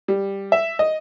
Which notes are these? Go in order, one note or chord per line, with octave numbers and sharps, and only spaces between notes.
G3
E5
D#5